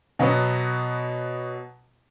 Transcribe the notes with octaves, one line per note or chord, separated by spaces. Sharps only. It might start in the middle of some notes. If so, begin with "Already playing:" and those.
B2 F#3 B3